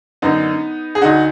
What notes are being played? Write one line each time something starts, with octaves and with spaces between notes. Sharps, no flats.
F#2 D3 B3 D#4
G#4
D2 D3 D#4 F#4